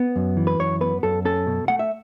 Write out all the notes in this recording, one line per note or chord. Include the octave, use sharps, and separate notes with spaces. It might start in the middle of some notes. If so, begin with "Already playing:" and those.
Already playing: B3
F#2
E3
B4
F#2 C#5
B3 B4
F#2 A4
C#4 A4
B2
A3 F#5
E5